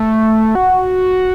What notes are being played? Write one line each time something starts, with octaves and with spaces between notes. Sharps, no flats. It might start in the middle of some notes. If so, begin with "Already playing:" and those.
Already playing: A3
F#4